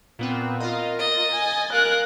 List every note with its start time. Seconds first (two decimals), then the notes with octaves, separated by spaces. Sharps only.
0.19 A#2 B3 C4
0.60 F4 A#4 D#5 F5
0.99 D#5 A6
1.31 G#5
1.73 A#4 F5 F#6